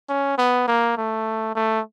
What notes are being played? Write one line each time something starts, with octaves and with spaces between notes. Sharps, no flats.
C#4
B3
A#3
A3
A3